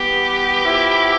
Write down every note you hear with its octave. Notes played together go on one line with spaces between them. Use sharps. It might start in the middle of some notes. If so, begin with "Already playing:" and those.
Already playing: E3 G3 B3 G4
F3 B3 E4